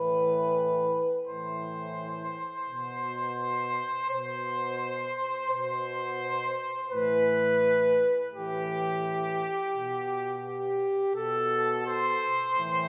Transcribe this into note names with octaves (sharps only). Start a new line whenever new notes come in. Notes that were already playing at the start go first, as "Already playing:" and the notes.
Already playing: A2 E3 B4
A2 E3 C5
B2
B2 C5
B2 C5
A2 E3 B4
A2 E3 G4
B2
G4
B2 A4
C5
A2 E3